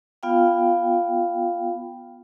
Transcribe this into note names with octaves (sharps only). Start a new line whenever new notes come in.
B3 F4 F5 G5